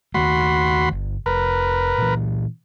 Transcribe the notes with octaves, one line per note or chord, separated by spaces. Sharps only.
D#2 D#3 A3 F#4 B5 C6
G1
F1 A#4 B4
A#2 E3